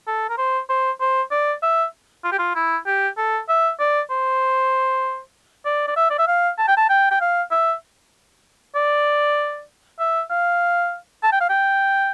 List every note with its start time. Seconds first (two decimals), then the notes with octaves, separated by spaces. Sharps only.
0.07 A4
0.30 A#4
0.38 C5
0.69 C5
1.01 C5
1.31 D5
1.63 E5
2.24 F4
2.32 G4
2.39 F4
2.55 E4
2.87 G4
3.17 A4
3.49 E5
3.79 D5
4.11 C5
5.65 D5
5.88 D5
5.96 E5
6.11 D5
6.19 E5
6.28 F5
6.58 A5
6.68 G5
6.77 A5
6.89 G5
7.11 G5
7.21 F5
7.51 E5
8.75 D5
9.99 E5
10.30 F5
11.23 A5
11.32 G5
11.41 F5
11.49 G5